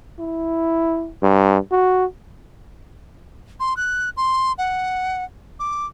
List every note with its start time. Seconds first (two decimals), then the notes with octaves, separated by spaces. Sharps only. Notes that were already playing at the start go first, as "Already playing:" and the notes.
0.19 E4
1.23 G2
1.72 F#4
3.60 C6
3.77 F#6
4.17 C6
4.58 F#5
5.59 D6